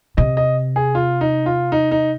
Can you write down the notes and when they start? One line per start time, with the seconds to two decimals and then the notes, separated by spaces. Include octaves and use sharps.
0.17 C3 D#5
0.37 D#5
0.76 G#4
0.95 F4
1.21 D#4
1.46 F4
1.72 D#4
1.91 D#4